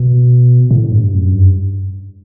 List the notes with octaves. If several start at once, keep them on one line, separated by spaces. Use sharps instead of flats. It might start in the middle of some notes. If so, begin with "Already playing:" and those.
Already playing: B2
A2
G2
F#2
G2